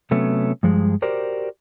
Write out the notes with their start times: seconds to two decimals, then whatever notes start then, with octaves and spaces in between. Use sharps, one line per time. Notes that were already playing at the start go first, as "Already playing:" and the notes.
0.11 C3 F#3 A3 B3 C#4
0.63 G2 F3 G#3
1.02 F#4 G4 A#4 C5 D5